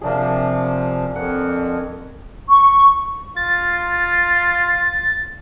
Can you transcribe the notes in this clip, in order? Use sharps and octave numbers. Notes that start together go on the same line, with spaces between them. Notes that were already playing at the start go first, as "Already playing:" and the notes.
C3 F3 A#3 D4 G#4
F2 A#3 F#5
C#6
F4 A6